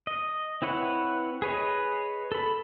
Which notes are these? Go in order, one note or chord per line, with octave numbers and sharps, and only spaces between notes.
D#5
C4 E4 B4 C#5 F#5
G#4 B4 C#5 D#5
A4 B5